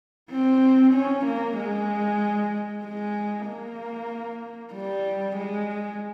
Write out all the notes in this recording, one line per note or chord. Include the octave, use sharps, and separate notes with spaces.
C4
C#4
A#3
G#3
G#3
A#3
G3
G#3